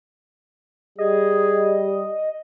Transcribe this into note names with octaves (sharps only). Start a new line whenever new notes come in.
G3 G#4 D#5